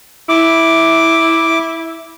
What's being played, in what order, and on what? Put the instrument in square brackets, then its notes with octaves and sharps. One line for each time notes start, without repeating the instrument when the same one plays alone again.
[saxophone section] E4 [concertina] D6